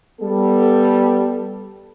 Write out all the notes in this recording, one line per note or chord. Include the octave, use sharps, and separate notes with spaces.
G3 B3 A4